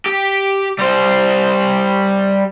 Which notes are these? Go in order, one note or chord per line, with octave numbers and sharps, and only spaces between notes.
G4
G3 C5